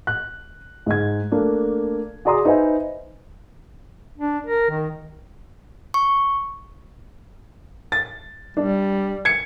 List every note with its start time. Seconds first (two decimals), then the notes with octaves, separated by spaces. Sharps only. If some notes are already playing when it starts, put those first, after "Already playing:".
0.07 F#6
0.86 G#2 G#6
1.32 A3 A#3 D4
2.25 F#4 G#4 D5 A#5 C6 D#6
2.45 D#4 B4 C5 E5 G#5
4.18 D4
4.46 A#4
4.70 D#3
5.94 C#6
7.92 A6
8.57 G3 D4
9.25 G#6 C#7